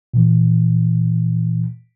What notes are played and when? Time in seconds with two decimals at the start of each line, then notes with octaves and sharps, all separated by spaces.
0.14 A#2 E3